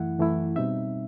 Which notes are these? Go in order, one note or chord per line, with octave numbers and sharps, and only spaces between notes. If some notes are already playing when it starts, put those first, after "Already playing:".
Already playing: F#2 E3 A3 E4 F#5
F#2 E3 A3 E4
B2 G3 C4 D#4 E5